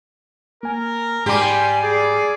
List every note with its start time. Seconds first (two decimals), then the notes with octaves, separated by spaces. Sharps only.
0.63 A#3 A#4 G#5
1.26 G#2 G3 G4 G#5 A#5 C6 D6
1.83 G#4 D5